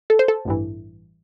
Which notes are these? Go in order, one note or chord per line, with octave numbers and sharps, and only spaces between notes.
A4
C5
A4
A1 G2 E3